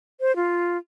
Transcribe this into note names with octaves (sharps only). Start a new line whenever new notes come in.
C5
F4